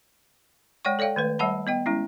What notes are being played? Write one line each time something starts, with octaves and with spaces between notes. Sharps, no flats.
G#3 C#5 D5 F#5 G5 C#6
A4 C#5 D5 F5 G5
D#3 A3 B4
G3 C#5 E5 F#5 A5 B5
B3 D#5 G5
G#3 C#4 E4